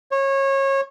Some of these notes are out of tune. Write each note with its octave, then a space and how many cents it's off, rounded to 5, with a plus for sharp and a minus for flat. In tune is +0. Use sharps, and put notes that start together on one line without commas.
C#5 -25